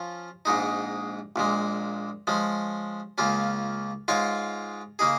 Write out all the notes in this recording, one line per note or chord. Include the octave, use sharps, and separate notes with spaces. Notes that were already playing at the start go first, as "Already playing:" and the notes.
Already playing: F3 C#4 F4
A#1 G#2 G#3 D#4
A#1 A#2 G#3
F3 G#3 C#4
C#2 C#3 A#3 C#4 F4
G#2 G#3 F4 C#5 F5
C#3 A#3 D#4 G#4